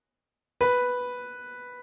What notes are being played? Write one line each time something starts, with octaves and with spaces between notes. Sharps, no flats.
B4